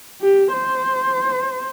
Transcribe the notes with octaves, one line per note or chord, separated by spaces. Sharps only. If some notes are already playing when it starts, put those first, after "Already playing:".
G4
C5